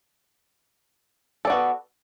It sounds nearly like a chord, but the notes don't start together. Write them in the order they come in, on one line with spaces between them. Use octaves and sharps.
A4 D5 F#4 B3